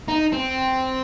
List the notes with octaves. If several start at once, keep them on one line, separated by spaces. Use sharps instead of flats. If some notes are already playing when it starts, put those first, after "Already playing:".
D#4
C4